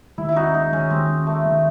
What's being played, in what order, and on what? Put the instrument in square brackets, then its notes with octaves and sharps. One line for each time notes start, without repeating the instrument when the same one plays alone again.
[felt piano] D#2 [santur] E4
[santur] E4
[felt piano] C#4 [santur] D#4 F#4
[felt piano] G#3 [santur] D#4
[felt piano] D#3 [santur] C#4
[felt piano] D#2 [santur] C4
[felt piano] C#4
[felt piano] G#3 [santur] A3
[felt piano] D#3